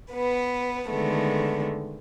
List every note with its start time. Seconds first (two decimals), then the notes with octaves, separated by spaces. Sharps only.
0.14 B3 B4
0.90 D3 D#3 G#3 A3 B3